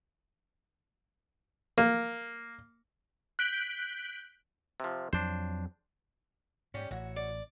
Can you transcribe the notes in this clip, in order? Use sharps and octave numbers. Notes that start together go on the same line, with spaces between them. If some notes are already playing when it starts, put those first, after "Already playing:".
A#3
F#6 G6 B6 D7
C3 F3
F2 F#3 D4 C5
G#2 G3 C#4
A1 A2 F#4 C#5 E5
D5